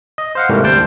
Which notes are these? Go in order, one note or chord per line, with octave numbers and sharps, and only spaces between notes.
D#5
C5 F5 F#5
G#2 C3 E3 G3 A3 A#3
D2 G3 C5 G5 A5 G6